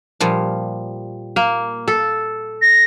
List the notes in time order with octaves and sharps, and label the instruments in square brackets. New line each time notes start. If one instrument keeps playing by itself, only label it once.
[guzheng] A#2 F3 G3
[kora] A#3
A4
[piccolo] A#6